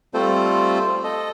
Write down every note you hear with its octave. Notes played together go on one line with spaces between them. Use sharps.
G3 A3 C4 F4 A4 C5
A4 D#5